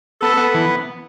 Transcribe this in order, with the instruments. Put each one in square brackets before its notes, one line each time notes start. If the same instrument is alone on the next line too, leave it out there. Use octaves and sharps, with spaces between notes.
[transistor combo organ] B3 [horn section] A4
[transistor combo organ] B3
E3